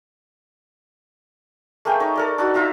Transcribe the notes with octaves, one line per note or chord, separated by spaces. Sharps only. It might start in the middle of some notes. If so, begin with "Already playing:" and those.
A3 A#3 G#4 G5
D#4 C#5
A4 A#4 D5
D4 D#4 F#4
D#4 F4 E5 A#5